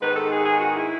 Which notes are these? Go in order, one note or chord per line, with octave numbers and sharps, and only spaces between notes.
G#2 D#3 G#3 B3 D#4 B4
A4
G#4
G#4
F#4
E4